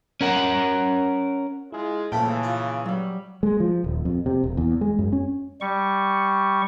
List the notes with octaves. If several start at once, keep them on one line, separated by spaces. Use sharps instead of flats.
C#4 A#4 F#5
G#3 E4 F4 G#4
A#2 C#3 E3 F3 A3 G5
F4
F#3 G3
G#3
F3
D#1
F2
C3
E1
E2
G#3
F#2
C#4
G3 C#6